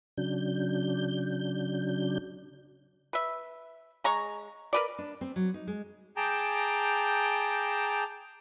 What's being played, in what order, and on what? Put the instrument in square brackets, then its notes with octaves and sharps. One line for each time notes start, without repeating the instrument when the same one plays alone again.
[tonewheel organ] C#3 F#3 D4 G6
[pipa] B4 E5
G#3 A#5 C#6
A#4 B4 D5
[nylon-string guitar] D4
C4
F#3
D#4
G#3
[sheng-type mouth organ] G#4 G5 A5 A#5 D6 G6